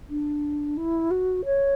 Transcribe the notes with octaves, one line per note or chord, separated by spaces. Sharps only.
D4
E4
F#4
C#5